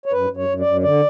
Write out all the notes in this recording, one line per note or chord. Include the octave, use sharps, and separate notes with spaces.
C#5
F#2 B4
F#2
C#5
F#2
D5
F#2
D3 D5